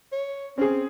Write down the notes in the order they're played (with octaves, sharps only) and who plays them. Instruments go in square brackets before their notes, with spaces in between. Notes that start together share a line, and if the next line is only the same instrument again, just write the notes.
[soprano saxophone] C#5
[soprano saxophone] C4 [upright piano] C#4 G#4